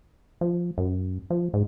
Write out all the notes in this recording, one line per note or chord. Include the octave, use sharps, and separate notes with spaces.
F3
F#2
F3
G#2